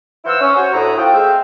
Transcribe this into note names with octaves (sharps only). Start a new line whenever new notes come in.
E3 E4 C5 F5 F#5 E6
C#4
F#4 C5 C#5
D2 A2 E4 F#5 A#5 D#6
C4 F4 F#4 A4 G5
G#3 A3 C4 E5 F5 G5